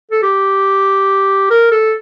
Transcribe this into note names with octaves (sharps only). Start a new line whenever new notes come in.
A4
G4
A#4
A4